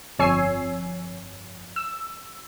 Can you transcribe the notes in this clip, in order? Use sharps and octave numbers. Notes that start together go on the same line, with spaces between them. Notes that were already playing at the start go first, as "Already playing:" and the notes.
G1 F2 C#5 G#5 E6 C7
E6